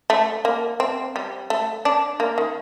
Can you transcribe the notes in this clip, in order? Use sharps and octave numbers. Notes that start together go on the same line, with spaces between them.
A3
A#3
C4
G3
A3
D4
A#3
D#3